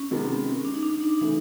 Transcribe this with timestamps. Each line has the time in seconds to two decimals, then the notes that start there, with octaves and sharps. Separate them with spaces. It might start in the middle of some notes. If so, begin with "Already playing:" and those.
Already playing: C#4
0.11 C3 D#3 G#3 B3
0.65 D4
0.74 D#4
0.83 D4
1.01 D#4
1.19 C#3 E3 A3 D#4